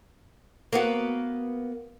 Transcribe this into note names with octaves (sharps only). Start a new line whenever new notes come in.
A#3 B3 F#4